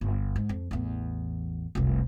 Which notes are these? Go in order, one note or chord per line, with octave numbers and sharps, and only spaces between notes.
G1
G#2
F2
A1 E2
F1 C2